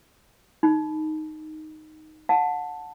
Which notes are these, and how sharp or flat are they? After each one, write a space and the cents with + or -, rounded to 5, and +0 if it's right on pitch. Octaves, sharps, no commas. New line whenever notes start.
D#4 +0 B5 +0
F#5 -20 A5 +0